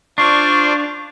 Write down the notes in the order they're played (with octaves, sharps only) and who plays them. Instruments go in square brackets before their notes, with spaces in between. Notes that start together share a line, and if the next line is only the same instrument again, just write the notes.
[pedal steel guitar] D4 [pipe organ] F4 C5 D5 [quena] C#6